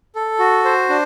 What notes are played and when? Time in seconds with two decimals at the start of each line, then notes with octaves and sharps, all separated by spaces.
0.15 A4
0.39 F#4
0.65 C5
0.89 D4